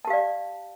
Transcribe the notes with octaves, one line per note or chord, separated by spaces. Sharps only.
G4 D5 F5 A5